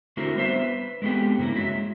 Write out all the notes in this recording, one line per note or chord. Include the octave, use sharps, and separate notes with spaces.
D3 A3 C4 E4 F#4 A#4
G3 B3 C5 E5
B4
G#3 A3 B3 C4 G4
G2 C#3 A#3 E4
F#3 G#3 E5